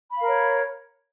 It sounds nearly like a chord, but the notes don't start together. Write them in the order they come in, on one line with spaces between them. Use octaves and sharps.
B5 F5 A#4 C#5